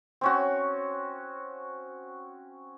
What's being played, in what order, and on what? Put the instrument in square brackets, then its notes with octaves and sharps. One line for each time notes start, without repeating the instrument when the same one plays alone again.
[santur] C4 C#4 F#4